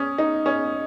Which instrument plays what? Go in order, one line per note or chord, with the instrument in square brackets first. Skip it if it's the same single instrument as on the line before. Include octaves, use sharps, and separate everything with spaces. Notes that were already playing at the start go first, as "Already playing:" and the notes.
Already playing: [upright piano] C#4 [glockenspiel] D#6
[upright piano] D#4
C#4